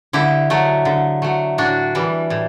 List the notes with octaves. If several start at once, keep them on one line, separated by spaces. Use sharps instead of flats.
D3 E4 G4
F#3 A3
D3
F#3 A3
A2 D4 F#4
E3 G3
A2